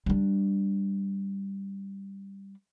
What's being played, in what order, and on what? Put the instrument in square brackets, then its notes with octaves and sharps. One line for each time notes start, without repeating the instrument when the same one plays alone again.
[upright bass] G3 D4